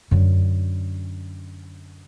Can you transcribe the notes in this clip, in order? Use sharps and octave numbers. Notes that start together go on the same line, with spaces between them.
F#2 D3